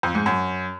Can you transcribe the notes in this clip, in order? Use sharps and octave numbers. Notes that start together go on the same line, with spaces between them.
F2
G#2
F#2